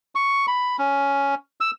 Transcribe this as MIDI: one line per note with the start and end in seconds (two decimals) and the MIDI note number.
0.15 0.46 85
0.48 0.77 83
0.78 1.35 61
1.61 1.71 88